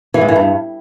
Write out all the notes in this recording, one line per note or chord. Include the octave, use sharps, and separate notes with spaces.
E3
G#2
E3
G2